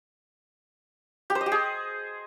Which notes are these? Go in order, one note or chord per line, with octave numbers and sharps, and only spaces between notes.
G4
C5
D#5
G4
G#4